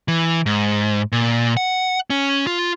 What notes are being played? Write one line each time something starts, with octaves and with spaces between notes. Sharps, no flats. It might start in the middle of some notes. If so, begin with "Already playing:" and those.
E3
G#2
A#2
F#5
C#4
F4